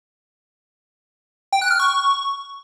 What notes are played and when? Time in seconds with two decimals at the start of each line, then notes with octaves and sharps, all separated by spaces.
1.53 G5
1.62 F#6
1.71 F6
1.80 C#6